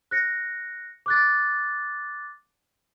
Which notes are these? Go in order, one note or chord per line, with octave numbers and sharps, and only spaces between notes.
F#6 A#6 C#7
D6 F#6 A6